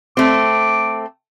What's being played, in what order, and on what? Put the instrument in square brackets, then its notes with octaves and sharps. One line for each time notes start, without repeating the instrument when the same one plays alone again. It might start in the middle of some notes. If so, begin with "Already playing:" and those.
[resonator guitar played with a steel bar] A3 C4 [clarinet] D6